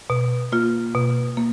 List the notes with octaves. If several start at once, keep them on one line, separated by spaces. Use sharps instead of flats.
B2
A#3 F4
B2
A#3